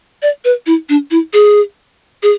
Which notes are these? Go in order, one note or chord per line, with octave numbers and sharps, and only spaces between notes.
D5
B4
E4
D4
E4
G#4
G#4